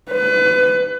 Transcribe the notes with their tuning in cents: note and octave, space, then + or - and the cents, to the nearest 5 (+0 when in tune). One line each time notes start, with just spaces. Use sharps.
B4 +30